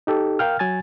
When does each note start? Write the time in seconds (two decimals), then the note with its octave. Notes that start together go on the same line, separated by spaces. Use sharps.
0.07 D#4 G4 A4
0.39 A#4 F5 G5 F6
0.59 F#3 G#5 A6